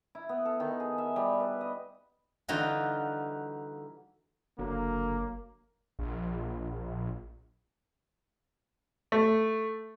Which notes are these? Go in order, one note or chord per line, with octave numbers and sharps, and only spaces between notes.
E4
B3
A4
D#3
G#4
E5
G3
B4
D#5
D3 E3 G3 D#4 F4 F#4
F#1 D3 F#3 A#3
A#1
A3